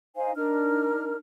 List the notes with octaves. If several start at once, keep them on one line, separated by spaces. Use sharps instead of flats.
D#4 C5 F5 G#5
D4 D#4 A#4 F6